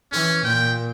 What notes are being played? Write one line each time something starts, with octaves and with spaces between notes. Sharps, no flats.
E3 C#4
A#2 G5